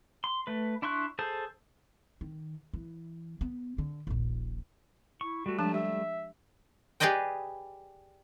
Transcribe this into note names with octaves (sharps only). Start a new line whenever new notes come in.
C6
A3 B4
D4 E4 C6 C#6 F#6
G#4 A4 C5 A5
D#3
E3
B3
D3
D#1 A#1
E4 C#6
G3 A3 F#4
F3 G#3 D4 A5
G4 E5
G4 G#4 B4 D5 D#5 G5